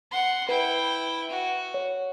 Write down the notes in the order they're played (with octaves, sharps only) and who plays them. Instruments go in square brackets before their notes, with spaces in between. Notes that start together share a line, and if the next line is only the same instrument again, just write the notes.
[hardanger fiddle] F#5 C6
[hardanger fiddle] E4 G5 [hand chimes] B4
[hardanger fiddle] F#4
[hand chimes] C#5